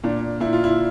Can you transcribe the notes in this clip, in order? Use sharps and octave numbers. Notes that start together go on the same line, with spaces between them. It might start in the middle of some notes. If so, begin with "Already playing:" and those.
A#2 D4
A#2 E4
F4
E4